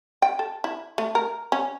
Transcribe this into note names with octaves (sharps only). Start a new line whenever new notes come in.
G5
A4
E4
A3
A#4
C#4